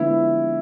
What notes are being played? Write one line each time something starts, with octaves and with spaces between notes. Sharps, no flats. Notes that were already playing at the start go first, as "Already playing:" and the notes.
Already playing: D3 F3 G#3 B3 E4